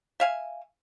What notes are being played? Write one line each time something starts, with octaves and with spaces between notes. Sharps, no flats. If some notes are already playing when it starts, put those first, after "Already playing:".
E5 F5 G#5